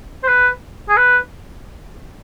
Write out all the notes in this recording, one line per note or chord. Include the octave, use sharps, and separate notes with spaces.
C5
B4
G#4
B4